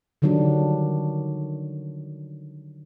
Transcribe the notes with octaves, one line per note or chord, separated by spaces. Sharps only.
D3 D#3 F#3 G3 D4